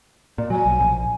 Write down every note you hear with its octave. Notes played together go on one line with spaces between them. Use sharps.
A#2 D5
F#3 G#5
B1
A#1